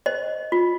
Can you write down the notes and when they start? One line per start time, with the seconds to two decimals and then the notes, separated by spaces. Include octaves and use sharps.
0.06 C5 D#5
0.52 F4